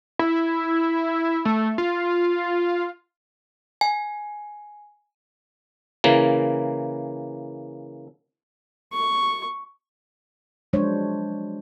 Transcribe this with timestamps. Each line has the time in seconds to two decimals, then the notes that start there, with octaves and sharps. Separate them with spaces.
0.19 E4
1.45 A3
1.78 F4
3.81 G#5
6.04 C#3 E3 A#3
8.93 C#6
10.73 F3 F#3 G#3 D4 C5 C#5